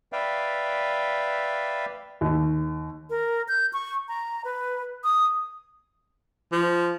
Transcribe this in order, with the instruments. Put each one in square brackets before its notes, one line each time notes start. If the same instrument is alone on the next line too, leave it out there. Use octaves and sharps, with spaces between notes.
[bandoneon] B4 D5 E5 F5 G5
[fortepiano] D#2
[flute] A#4
G6
C#6
A#5
B4
D#6
[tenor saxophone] F3